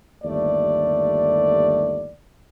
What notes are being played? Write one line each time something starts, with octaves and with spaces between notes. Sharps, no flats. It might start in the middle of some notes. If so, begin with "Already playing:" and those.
G1 D#2 A3 D5